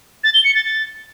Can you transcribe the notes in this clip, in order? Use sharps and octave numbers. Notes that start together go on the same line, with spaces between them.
A6
G7
C#7
A6
A6